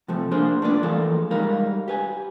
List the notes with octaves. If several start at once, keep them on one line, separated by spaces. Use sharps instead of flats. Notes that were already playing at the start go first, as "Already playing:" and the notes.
C3 F3 A3
A#3 D4 G#4 C5
A3 D4 F4 B4 D5
E3 F3 A3 A#3 G#4 A4
G3 G#3 D#4 A#4 F5
G4 B4 G#5